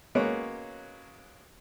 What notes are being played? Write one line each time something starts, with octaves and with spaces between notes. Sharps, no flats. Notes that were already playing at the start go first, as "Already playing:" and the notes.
F#3 G#3 A#3 B3 C#4